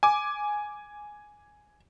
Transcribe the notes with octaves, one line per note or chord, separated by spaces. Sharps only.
G#5 D6